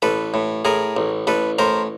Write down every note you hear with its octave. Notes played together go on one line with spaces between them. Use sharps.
A1 A4 B4
A2
A2 G#4 A#4
A1
A1 A4 B4
A2 A#4 C5